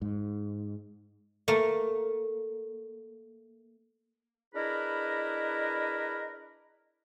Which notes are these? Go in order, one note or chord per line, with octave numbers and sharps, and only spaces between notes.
G#2
A3 A#3
D4 E4 G#4 A#4 B4 D#5